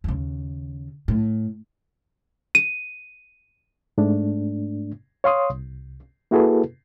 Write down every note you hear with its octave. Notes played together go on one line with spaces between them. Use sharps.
D#2 C#3
A2
D#7
G#2 A3 D4
C#5 F5 C6 D#6
C2
A#3 E4 F#4 G#4 A4 B4